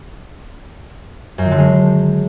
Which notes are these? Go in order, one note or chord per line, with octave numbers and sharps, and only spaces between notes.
F#2
D#3
D3
G#3